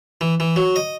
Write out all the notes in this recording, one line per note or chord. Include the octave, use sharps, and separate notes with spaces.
E3
E3
F#3
D#5